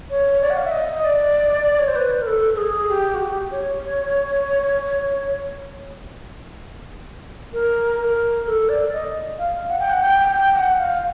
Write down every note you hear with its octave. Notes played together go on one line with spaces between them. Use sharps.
C#5
D5
F#5
F5
E5
D#5
D5
C#5
C5
B4
A#4
A4
A4
G#4
G4
F#4
G4
C#5
A#4
A#4
A4
D5
D#5
F5
F#5
G5
F#5
G5
G5
F#5
F5